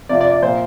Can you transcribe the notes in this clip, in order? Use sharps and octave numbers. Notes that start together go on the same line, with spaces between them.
C3 F3 D5
D5
D5
A#2 F3 C5